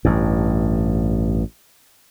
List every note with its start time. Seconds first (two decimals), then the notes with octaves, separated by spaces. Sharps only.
0.05 A1 G2